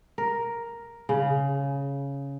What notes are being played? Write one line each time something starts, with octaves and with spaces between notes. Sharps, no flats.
A#4
C#3